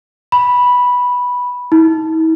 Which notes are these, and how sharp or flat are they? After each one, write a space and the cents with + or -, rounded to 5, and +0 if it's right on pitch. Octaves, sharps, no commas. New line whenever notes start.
B5 -5
E4 -45